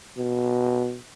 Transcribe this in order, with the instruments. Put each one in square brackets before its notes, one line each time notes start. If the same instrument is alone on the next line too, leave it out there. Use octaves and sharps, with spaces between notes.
[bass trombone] B2